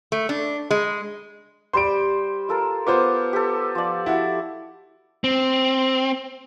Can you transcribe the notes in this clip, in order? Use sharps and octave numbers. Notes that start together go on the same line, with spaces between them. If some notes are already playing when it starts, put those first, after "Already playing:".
A3
D4
G#3
G3 C5 C6 D7
F4 A4 A#4
B3 F4 C5 D6
G4 A4
F3 D5
E4 F#4
C4